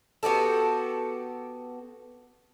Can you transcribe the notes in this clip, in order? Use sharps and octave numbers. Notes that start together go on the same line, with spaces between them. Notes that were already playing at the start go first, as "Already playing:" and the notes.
B3 F#4 G4 A4